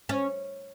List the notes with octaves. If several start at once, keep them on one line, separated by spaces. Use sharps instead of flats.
C#4